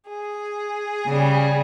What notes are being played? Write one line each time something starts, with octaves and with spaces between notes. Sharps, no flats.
G#4
C#3 G3